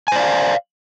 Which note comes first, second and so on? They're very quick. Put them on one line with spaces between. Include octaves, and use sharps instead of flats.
G#5 C5 D5 F5